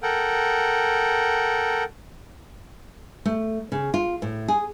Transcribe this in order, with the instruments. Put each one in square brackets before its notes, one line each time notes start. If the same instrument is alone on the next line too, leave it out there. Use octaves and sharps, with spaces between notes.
[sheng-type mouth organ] A4 A#4 F#5 G5
[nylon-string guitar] A3
C#3
F4
A2
G#4